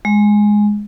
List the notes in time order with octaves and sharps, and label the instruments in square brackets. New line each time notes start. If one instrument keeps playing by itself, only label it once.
[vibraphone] G#3